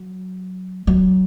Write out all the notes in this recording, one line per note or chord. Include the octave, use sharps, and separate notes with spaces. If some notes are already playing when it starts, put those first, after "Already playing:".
Already playing: F#3
F#3